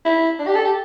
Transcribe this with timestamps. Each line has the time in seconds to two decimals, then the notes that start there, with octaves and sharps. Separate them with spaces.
0.05 E4
0.39 D4
0.47 G4
0.55 A4
0.65 G4